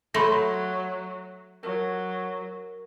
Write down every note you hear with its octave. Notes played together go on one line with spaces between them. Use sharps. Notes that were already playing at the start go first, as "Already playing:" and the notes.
F#3 A3 B5 C6 A#6
F#3 A#4